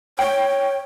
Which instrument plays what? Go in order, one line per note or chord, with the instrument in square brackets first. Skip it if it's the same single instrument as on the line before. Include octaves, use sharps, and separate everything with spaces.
[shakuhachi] C#5 [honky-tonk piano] G5